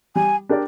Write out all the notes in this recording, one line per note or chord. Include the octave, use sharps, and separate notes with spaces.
G3 G#5
D4 G4 A#4 D5